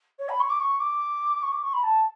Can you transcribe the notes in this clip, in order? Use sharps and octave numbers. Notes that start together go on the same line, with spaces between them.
C#5
B5
C#6
D6
C#6
D6
C#6
D6
C#6
B5
A5